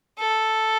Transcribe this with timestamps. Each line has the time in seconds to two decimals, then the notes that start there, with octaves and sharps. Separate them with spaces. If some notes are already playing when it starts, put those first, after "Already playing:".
0.19 A4